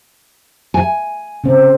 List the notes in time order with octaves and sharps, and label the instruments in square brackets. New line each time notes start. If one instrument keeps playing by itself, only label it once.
[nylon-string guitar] G#5
[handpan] C#3 C4